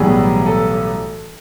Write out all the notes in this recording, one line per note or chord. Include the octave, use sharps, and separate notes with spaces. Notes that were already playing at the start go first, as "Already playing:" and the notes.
Already playing: B1 A2 E3 G3 B3 G#4
A4